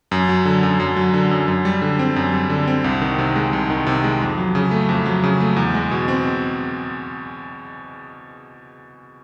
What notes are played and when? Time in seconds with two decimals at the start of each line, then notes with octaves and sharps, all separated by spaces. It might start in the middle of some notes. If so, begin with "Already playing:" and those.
0.11 F#2
0.29 F#3
0.45 D3
0.63 F#2
0.80 F#2
0.97 F#3
1.14 D3
1.31 F#2
1.48 F#2
1.65 G3
1.82 D3
1.99 C4
2.16 F#2
2.33 G3
2.49 D3
2.67 C4
2.84 C2
3.02 D#3
3.18 C3
3.36 G#3
3.53 C2
3.70 D#3
3.86 C3
4.04 G#3
4.21 F2
4.38 F#3
4.55 C#3
4.71 A3
4.89 F2
5.06 F#3
5.24 C#3
5.40 A3
5.56 E2
5.74 G#3
5.91 B2
6.08 C4